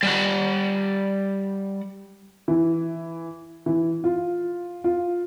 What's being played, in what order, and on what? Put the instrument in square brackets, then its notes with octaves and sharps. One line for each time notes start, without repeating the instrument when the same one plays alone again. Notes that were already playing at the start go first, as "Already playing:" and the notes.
[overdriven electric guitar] G3 F#5
[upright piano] E3
E3
F4
F4